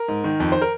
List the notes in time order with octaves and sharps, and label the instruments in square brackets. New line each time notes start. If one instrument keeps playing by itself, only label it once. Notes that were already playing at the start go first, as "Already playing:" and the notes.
Already playing: [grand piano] A#4
G#2
D#3
F2
C5
A#4